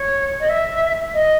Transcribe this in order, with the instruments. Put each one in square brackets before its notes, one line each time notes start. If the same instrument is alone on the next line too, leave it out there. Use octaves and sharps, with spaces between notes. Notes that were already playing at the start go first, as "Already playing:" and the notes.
Already playing: [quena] C#5
D#5
E5
D#5